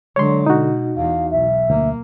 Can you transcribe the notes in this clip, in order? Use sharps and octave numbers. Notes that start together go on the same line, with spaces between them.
D3 F#3 G#3 C#5 C6
B2 D#4 F#4
E2 F5
B1 E5
D2 A#3